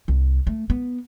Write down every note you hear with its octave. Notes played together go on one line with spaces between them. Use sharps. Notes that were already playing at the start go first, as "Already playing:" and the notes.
C2
A3
B3